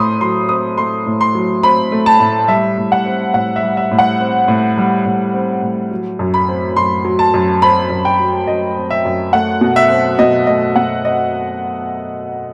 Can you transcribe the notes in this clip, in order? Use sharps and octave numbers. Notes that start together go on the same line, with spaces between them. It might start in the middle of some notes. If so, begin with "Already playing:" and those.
Already playing: A2 A3 C4 B5 C6 D#6
F#3 C6
C4 D#6
A3 C6
A2
C6
F#3
C4 B5
A3
A5
A2
G3 E5
A2
F#5
C4
A2 F#5
E5
G3
E5
A2
F#5
C4
A2
G3
A2
C4
A2
F#3
F#2
B5
C4
F#2 C6
F#3
A5
F#2
C4 B5
F#2
G5
F#3
F#2 D#5
C4
E5
F#2
A3 F#5
B2
E5
C4
B2 D#5
A3 D#5
B2 F#5
C4 D#5